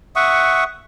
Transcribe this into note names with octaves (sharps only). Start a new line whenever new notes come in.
E5 F#5 C#6 D#6